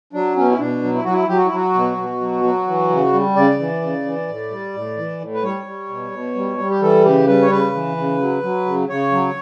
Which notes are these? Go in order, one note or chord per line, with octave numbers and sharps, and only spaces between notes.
F#3 D4
B2 C#4
E4
B2 D4
F#3
E4
F#3 F#4
E4
F#3 G4
F#4
E4
F#3 F#4
B2
B2
F#3
F#3
E3
C#3
G3
C#3 D5
E3
C#3
E3
A2
G3
A2
E3
A2
B4
G3 C#5
G3
B2
B2
G3
G3
G4
E3 A4
C#3 G4
G3 B4
C#5
C#3 B4
E3
C#3
F#3
F#3
C#3
C#3 C#5
F#3